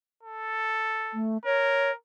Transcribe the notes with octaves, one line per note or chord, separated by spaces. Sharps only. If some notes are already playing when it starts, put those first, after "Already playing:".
A4
A3
A#4 C#5